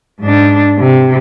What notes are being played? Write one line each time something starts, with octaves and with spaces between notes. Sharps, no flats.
G#2 D4
C3